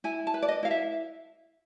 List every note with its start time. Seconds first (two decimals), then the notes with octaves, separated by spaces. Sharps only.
0.04 E4 G#5
0.27 A5
0.34 B4
0.42 D5
0.48 D#5
0.63 E4 F5
0.71 E5